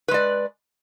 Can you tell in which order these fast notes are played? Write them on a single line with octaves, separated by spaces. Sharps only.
B4 G#3 D5